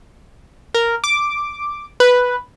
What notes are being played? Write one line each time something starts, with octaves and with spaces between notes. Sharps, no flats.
A#4
D6
B4